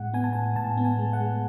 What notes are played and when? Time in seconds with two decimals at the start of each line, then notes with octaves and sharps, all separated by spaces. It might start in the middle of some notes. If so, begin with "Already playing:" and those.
Already playing: A2 G#3 F#5
0.14 B3 G#5
0.24 A5
0.33 A2 G#5
0.56 A2 A5
0.77 B3
0.85 G#5
0.99 G#3
1.13 F#5
1.20 G#3